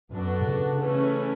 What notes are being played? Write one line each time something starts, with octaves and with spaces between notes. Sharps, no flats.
F#2 B3 D4 F#4 A4
C#3
E3 A3 C#4